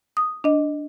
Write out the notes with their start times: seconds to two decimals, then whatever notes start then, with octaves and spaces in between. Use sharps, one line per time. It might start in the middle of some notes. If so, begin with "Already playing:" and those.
0.17 D#6
0.44 D4 D#5